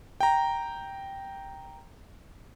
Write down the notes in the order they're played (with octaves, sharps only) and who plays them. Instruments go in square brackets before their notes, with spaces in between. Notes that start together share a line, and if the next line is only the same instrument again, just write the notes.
[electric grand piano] G5 A#5